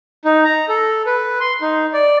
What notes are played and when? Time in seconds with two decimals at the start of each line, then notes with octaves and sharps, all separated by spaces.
0.25 D#4
0.44 A#5
0.69 A4
1.06 B4
1.40 C6
1.61 D#4
1.93 D5